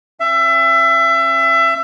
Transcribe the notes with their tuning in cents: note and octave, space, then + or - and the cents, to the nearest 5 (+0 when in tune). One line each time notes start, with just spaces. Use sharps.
C#4 -45 E5 +25